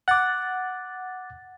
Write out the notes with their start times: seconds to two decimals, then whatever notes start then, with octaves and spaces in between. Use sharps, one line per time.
0.08 F#5 D6 F#6 A6